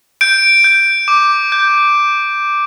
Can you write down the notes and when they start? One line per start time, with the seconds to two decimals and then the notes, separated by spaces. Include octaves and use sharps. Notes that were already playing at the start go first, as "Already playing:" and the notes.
0.21 G6 D7
0.64 G6
1.08 D6
1.52 G6